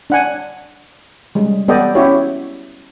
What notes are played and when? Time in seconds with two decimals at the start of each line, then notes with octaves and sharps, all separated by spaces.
0.10 D4 F#5 G#5
1.35 G3 G#3
1.68 B3 G4 A4 D5 D#5 G5
1.95 C#4 E4 F#4 G4 C#5